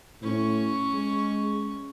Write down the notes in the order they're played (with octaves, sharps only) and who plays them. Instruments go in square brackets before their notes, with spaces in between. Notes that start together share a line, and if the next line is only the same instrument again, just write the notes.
[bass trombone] A2 [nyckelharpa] C#4 C#6
[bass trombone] G#3